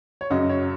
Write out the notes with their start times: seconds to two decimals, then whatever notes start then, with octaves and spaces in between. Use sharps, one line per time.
0.21 C#5
0.30 F#2 C#3 F#3 D#5
0.49 C#5